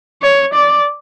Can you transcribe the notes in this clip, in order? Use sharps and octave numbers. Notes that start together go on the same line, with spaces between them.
C#5
D5